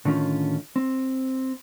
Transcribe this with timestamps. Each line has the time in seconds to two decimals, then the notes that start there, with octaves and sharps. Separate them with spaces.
0.05 A2 D3 D#3 C#4 F4
0.76 C4